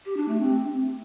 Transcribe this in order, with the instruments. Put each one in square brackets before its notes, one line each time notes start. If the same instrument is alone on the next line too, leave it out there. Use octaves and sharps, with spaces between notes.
[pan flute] G4
D4
A3
C4